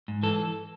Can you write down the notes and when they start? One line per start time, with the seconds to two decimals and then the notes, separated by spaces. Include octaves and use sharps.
0.08 G#2
0.23 E3 A4